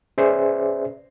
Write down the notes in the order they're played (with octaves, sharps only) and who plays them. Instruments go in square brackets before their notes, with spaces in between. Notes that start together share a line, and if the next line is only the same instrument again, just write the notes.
[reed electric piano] C#4 G#4 B4 C5 D5 E5